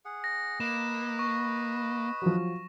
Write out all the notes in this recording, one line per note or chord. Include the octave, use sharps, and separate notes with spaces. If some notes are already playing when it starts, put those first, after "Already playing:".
G#4 F#5
A#6
A#3 B4 D#5 B5 E7
C#6
F3 F#3